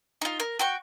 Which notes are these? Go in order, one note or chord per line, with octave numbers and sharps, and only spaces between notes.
D#4 F4
A#4
F#4 G5 C#6